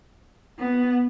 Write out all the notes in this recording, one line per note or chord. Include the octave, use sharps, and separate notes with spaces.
B3